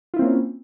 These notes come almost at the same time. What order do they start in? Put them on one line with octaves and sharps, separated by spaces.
F4 E4 C4 A#3 C#4